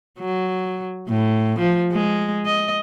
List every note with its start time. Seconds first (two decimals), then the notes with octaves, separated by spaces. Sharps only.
0.19 F#3
1.09 A2
1.59 F3
1.92 G#3
2.46 D#5